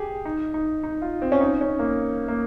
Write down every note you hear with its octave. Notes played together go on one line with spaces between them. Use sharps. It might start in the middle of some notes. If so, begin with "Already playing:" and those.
Already playing: G4 G#4
D#4
D#4
D#4
F4
C4
C#4
D#4
C#4
A#3
A#3